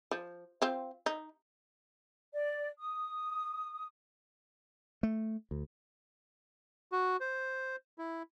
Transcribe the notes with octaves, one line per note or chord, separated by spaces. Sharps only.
F3
C4 F4
D#4
D5
D#6
A3
D2
F#4
C5
E4